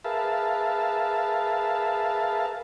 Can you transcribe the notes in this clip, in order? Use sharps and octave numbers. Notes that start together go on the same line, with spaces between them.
G#4 A#4 B4 E5 F5 A5